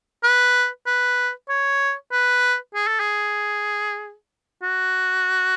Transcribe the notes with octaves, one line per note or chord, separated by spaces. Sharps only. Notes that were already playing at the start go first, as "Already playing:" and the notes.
B4
B4
C#5
B4
G#4
A4
G#4
F#4